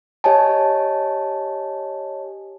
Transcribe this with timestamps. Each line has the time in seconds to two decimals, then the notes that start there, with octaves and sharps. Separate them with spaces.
0.24 G4 C#5 D#5 G#5 A5